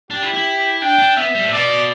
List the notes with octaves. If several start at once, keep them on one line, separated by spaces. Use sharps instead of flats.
D4 G4
E4
E4
D4 G5
D4
B3 E5
G3
A2
B2 D5